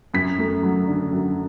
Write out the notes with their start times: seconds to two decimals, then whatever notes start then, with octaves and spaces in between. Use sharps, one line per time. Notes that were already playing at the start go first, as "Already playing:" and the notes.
0.14 F#2 B6
0.39 A3
0.63 F#3
0.87 D3
1.12 F#2